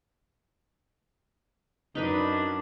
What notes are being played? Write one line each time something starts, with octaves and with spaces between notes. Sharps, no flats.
F#2 D4 D#4 B4 D#5